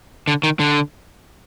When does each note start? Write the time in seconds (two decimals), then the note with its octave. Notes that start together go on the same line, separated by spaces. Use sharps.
0.28 D3
0.43 D#3
0.60 D3